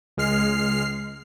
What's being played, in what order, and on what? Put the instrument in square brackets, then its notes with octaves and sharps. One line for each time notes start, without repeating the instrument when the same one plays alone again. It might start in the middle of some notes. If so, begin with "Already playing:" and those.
[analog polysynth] C#2 G#3 F6 C7